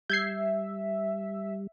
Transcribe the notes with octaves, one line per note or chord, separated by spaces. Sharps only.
G3 E5 G6 G#6 C7